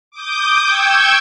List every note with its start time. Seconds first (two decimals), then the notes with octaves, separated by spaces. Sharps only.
0.11 D6 D#6 G6
0.64 G5 C#6 E6 G6 G#6